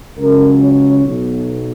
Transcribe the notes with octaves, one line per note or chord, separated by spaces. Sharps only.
C#2 C#3 F#3 A#4
C#5
B1 B2 F#3